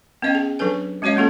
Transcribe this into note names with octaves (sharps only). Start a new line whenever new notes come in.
B3 C#4 D#5 F5 G5
G#4
F#3 D4 A4 B4 G#5
G#3 C#4 F#4 C#5 D#5 F5
A#3 C#4 F4 G#4 A4